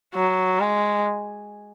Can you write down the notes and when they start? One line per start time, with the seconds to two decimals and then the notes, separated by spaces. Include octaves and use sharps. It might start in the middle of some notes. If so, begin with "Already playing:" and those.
0.15 F#3
0.60 G#3